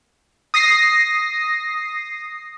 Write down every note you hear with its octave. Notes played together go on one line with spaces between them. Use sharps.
D#6 A#6 C7